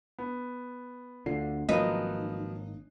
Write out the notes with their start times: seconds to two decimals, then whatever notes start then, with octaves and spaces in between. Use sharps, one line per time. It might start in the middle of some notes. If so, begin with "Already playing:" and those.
0.19 B3
1.26 D2 D3 F4 C7
1.69 G#1 F3 F#3 A#3 C#4 D#4 B4